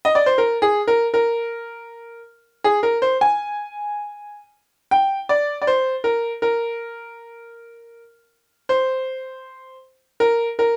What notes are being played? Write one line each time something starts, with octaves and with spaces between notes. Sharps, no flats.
D#5
D5
C5
A#4
G#4
A#4
A#4
G#4
A#4
C5
G#5
G5
D5
D5
C5
A#4
A#4
C5
A#4
A#4